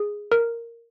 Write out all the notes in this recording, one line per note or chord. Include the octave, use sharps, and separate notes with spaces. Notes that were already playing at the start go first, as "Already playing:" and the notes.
Already playing: G#4
A#4